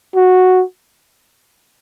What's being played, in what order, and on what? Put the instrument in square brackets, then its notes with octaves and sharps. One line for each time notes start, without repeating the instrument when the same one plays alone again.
[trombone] F#4